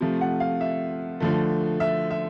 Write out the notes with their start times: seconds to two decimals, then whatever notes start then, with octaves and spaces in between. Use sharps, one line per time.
0.01 C3 F3 A3
0.21 F#5
0.40 F5
0.61 E5
1.20 D3 F3 A3
1.80 E5
2.11 E5